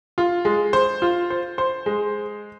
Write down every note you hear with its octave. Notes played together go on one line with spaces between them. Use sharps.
F4
G#3
C5
F4
C5
C5
G#3